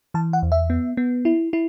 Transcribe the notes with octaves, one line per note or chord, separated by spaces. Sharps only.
E3 A5
F#5
E2
E5
B3
B3
E4
E4